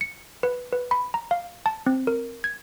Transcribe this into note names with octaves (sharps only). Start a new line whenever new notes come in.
C#7
B4
B4
B5
A#5
F5
A5
C4
A#4
G#6